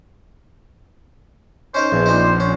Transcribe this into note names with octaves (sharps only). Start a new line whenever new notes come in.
C#4 D#4 A#4 C5
A#1 E2
A#2 C4 D#4
C#4